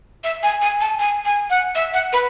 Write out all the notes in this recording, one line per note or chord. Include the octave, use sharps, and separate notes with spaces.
E5
G#5
G#5
A5
G#5
G#5
F#5
E5
F#5
B4